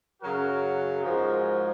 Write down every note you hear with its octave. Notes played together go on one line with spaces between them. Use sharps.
F#2 C#3 F#3 F#4 A#4
G#2 F3 G#3 F#4 A#4